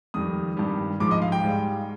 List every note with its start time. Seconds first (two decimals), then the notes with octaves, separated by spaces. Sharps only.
0.14 F2 D#3 G3 D#6
0.57 G2 D#3 G3
1.00 G#2 F3 D6
1.11 D#5
1.22 F5
1.32 G5
1.44 G#2 G3